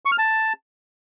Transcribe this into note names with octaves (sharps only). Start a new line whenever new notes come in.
C#6
F6
A5